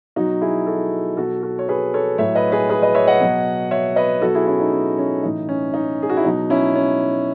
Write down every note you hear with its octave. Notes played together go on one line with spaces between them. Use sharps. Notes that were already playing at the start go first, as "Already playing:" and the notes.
B2 F#3 D#4 F#4
E4 G#4
F#4 A4
B2 F#3 F#4 A4
F#4 A4
C#5
G#4 B4
A4 C#5
A2 F#3 C#5 E5
B4 D#5
G#4 B4
G#4 B4
B4 D#5
C#5 E5
D#5 F#5
B2 F#3
C#5 E5
B4 D#5
B2 F#3 F#4 A4
E4 G#4
C#4 E4
D#4
C#4
C#4
A2 E3 D#4
C#4
D#4
G#4
F#4
E4
B2 F#3 D#4
C#4 E4
C#4